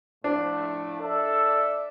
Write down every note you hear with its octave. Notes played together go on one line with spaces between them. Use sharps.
A2 F3 A3 D4
A4 D5 E5